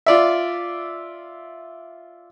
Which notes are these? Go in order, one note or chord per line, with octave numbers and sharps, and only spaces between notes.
F4 D5 E5